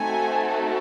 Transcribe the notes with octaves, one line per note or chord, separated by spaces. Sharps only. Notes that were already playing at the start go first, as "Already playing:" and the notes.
Already playing: A3 C4 D#4 F#4 A4 G#5